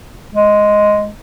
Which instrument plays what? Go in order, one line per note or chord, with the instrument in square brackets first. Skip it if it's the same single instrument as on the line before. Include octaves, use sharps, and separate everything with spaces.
[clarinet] G#3